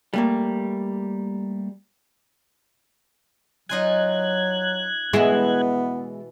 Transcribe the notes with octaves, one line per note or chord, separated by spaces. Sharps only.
G3 A3 A#3
F#3 D#4 F4 G#5 F#6 G#6
B2 E3 G#3 B3 E4